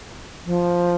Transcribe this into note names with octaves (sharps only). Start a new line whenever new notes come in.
F3